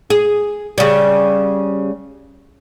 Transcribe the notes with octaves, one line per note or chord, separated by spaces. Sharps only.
G#4
C#3 G3